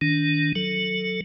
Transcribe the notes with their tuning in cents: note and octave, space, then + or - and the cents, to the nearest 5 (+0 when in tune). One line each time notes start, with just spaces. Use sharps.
D#3 +0 D4 -25
F#3 +0 A4 +10